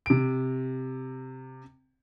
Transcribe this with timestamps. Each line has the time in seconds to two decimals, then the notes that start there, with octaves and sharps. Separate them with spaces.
0.06 C3 D7